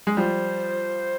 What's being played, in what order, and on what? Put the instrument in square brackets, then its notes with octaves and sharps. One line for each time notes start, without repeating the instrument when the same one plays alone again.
[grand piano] G#3
[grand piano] F3 G3 [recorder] C5